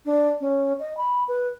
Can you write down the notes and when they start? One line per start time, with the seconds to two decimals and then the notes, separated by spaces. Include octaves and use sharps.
0.05 D4
0.41 C#4
0.79 D#5
0.97 B5
1.28 B4